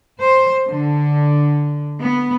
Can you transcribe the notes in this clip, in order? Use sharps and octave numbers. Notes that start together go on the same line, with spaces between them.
C5
D3
B3